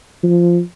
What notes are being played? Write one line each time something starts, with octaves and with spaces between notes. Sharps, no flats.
F3